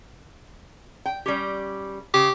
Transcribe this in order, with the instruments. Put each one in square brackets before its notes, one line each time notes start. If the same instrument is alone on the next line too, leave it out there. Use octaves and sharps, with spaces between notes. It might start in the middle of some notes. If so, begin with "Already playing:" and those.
[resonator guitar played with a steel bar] G5
G3 C#4 G4
[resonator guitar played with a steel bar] C#3 [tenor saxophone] G4